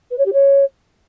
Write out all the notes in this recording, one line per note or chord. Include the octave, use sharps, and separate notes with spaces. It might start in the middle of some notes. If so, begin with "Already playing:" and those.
B4
C#5
G4
C#5